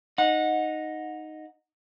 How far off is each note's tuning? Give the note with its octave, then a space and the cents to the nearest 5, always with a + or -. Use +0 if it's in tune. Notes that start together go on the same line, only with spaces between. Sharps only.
D#4 +0 F#5 -20